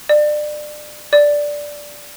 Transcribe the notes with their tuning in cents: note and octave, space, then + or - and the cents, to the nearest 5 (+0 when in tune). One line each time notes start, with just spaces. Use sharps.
D5 +30
D5 -5